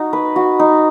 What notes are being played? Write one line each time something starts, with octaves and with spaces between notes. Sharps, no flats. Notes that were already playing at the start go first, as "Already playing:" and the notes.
Already playing: D#4 F#4
B4
F#4
D#4